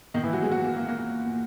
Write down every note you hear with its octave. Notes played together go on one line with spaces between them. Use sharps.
A#2 D#3 D#4
E3 E4
F#3 F#4
G#3 G#4
A#2 F#3 F#4
A#3
A#3
A#2 A#3
A#2